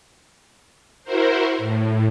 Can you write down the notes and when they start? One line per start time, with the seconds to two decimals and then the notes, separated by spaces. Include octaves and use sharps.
1.04 E4 F#4 A#4 C5
1.58 A2